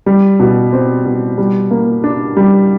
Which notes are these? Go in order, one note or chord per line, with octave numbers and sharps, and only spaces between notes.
G3
B2
C4
B2
G3
A#3
D4
G3